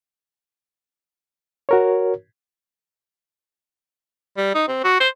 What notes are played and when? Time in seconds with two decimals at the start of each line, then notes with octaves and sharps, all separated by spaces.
1.69 F#4 A#4 C#5
4.38 G3
4.55 D#4
4.68 C4
4.84 F#4
5.00 C5